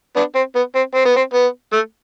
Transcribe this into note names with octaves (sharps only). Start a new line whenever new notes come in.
B3 D4
C4
B3
C4
C4
B3
C4
B3
A3